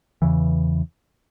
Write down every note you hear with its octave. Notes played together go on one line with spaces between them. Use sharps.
E2 C#3 E3